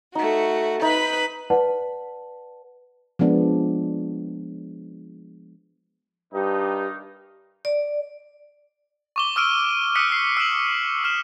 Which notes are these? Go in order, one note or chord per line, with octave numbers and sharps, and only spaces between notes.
A3 D#4 F#4
D#4 B4 B5
B4 D5 F#5 A5
F3 G#3 B3 D4
G2 D#3 D4 D#4 G4
D5
C#6 D6 G7
D6 E6 F6 D7 D#7
D#6 E6 F#6 B6 C#7 F#7
C7
E6 F#6 D7 E7 F#7
E6 F6 E7